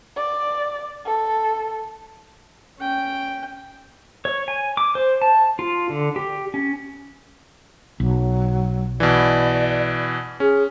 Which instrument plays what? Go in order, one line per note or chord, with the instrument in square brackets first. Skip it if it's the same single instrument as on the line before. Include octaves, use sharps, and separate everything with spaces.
[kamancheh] D5
A4
[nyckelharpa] C#4 G5
[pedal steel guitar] C#5
G#5
D6
C5
A5
F4
D3
G4
C#4
[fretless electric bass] B1 [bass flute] F#3
[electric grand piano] B2 E3 [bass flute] D5
[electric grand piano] C#4 [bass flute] G#4